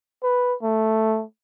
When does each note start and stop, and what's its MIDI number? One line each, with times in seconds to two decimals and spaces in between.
0.23 0.55 71
0.63 1.24 57